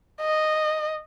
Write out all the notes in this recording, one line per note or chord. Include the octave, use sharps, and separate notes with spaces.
D#5